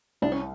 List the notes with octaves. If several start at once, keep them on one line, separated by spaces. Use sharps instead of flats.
C2 D4
C#4